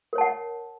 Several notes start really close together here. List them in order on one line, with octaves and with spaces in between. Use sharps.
A#4 C#5 A5 F#5